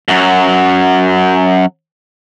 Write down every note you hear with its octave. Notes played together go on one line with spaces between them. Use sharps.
F#2 F#3